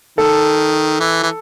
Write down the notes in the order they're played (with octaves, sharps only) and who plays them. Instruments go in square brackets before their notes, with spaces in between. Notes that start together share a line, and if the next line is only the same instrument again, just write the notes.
[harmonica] D#3 [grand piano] A4
[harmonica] E3
E3